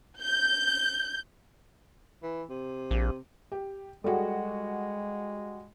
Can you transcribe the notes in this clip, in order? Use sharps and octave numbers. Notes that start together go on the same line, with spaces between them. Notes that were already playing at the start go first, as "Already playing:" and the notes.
G6
E3
C3
A#1
G4
G3 G#3 F#4 G#4 A4 F#5